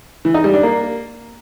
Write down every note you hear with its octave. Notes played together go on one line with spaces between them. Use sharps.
E3
D#4
G3
D4
A#3